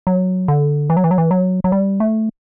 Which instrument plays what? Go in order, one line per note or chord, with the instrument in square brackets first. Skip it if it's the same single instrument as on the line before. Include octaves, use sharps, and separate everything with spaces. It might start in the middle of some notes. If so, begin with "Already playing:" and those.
[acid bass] F#3
D3
E3
F#3
E3
F#3
E3
F#3
F#3
G3
A3